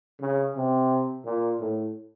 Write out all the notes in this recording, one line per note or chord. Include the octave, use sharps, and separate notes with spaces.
C#3
C3
A#2
A2